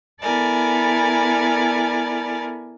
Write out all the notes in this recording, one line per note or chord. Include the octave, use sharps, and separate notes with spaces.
B3 E4 A4 A#4 D5 G#5